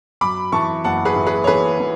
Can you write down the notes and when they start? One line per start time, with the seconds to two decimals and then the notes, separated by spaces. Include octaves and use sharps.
0.21 F#2 B5 D6
0.52 E3 A5 C#6
0.84 F#1 F#5 A5
1.05 G#4 B4
1.16 E3
1.27 G#4 B4
1.44 C#5
1.47 E3 G#4 B4
1.80 E3